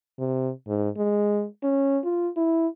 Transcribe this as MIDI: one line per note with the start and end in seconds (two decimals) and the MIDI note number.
0.19 0.51 48
0.67 0.89 44
0.97 1.46 56
1.63 1.99 61
2.04 2.29 65
2.37 2.67 64